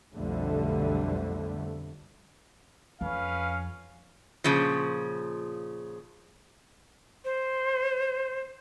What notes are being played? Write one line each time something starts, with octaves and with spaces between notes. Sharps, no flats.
B1 F2 D3 G3 A3
F2 C#4 B4 F5
A#2 C#3 F3
C5